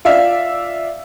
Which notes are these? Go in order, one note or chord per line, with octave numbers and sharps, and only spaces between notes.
F4 D5 E5 F5